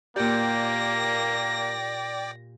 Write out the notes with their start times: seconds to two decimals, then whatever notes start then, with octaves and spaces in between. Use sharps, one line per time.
0.16 A#2 A#3 G4 D5 G5 D6 A#6